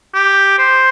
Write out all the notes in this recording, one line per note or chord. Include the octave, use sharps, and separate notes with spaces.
G4
C5